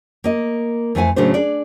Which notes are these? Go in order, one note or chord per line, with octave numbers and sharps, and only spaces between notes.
A#3 D#5
F2 E3 A3 E4 C5 G#5
A2 C#3 F#3 A3 D4 C5
D4 G#4 D5